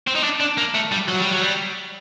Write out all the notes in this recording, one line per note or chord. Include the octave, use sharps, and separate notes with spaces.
C4
D#4
D4
D4
A#3
A3
G3
F#3
G3
F#3
G3